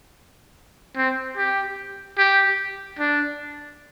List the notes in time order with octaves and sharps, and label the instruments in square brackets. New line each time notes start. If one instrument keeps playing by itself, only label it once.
[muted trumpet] C4
G4
G4
D4